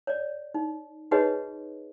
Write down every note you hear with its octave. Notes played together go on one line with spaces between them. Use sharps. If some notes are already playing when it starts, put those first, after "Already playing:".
C#5 D5
D#4
D#4 F#4 G#4 B4 C#5 D#5